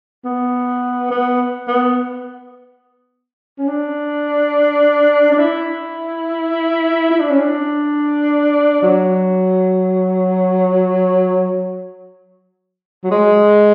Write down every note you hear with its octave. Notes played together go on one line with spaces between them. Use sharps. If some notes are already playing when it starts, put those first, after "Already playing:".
B3
B3
B3
C#4
D4
D4
E4
E4
D4
C#4
D4
F#3
F#3
G#3